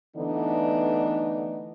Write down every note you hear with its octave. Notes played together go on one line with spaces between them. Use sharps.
D3 E3 A3 B3 D4 D#4